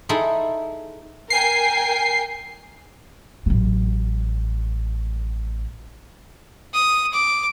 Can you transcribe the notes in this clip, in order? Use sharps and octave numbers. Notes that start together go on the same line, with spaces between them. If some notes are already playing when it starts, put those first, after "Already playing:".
D#4 E4 G#4 A4 B5 C6
A#4 G5 G#5 C7
A1 F#3
D#6
D6